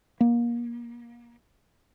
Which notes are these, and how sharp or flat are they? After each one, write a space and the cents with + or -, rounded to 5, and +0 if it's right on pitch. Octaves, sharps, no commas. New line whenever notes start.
A#3 +30